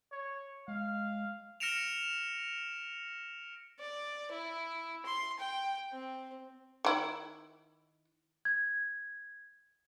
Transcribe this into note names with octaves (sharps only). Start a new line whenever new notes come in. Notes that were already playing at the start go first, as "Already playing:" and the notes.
C#5
G#3 F5
F6 A#6 C#7 D7 E7 F7
D5
E4
C6
G5
C4
D#3 E4
G#6